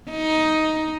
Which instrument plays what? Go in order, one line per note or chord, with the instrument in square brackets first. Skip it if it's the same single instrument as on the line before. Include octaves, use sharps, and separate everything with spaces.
[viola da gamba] D#4